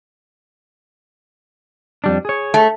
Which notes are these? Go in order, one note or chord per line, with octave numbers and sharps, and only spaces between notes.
F2 G3 D4
G#4 C#5
A3